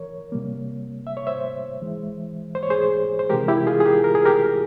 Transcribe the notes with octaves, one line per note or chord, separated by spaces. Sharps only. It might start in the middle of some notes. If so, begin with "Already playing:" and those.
Already playing: E3 A#4 C#5
C3 G3 A#3
E5
C#5
C5 E5
E3 G#3
C5
C#5
G#4 C5
C5
C3 E3 G#3 G4 A#4
E4 G4
F4 G#4
G#4
G4 A#4
A#4
G#4
G4 A#4